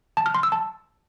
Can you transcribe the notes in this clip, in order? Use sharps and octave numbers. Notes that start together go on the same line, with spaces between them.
A5
F6
C6
E6
A5